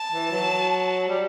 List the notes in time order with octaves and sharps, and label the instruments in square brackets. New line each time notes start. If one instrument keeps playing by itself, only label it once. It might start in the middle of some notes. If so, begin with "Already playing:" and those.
Already playing: [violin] A5
[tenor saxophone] E3
F#3
G3